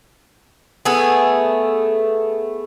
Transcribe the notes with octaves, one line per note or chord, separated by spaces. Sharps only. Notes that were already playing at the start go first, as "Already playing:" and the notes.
A3 B3 E4 G#4